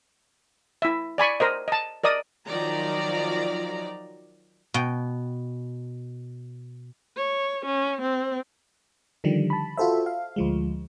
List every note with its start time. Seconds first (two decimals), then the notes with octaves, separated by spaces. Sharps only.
0.82 E4 E5
1.18 D5 G#5 B5 C#6
1.40 A#4 C5 D#5
1.68 D#5 A5
2.04 A#4 D5 D#5 D#6
2.47 D#3 F3 F#3 D5 A#5
4.74 B2 G5
7.16 C#5
7.66 C#4
8.02 C4
9.24 D3 D#3 F3 G3
9.50 A5 B5
9.77 F4 F#4 A4 C5 E5
10.06 F5
10.36 D2 F3 G#3